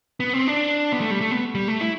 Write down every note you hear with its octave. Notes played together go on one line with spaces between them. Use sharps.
B3
C4
D4
B3
A3
G3
A3
B3
G3
A3
E4